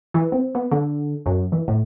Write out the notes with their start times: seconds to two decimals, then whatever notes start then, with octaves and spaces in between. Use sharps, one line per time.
0.14 E3
0.32 C4
0.55 B3
0.71 D3
1.26 F#2
1.52 E3
1.68 A2